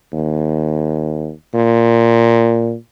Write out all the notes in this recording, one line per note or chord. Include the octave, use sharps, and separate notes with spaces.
D#2
A#2